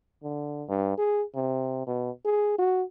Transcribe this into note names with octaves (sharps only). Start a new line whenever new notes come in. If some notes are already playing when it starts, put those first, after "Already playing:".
D3
G2
G#4
C3
B2
G#4
F#4